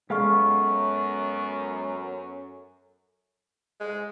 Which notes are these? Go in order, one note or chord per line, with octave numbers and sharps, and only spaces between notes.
F#2 G#3 B3 A4 F5 C#6 F6
G#3